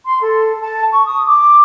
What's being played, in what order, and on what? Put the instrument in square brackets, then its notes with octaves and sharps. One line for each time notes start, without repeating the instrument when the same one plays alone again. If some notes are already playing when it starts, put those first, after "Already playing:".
[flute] C6
A4
A5
C#6
D#6
D6